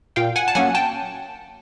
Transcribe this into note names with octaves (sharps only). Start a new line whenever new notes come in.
A#2 F5 G5
F#5 G#5
A5
F#3 A#3 C#4 F#5 G#5
G5 A5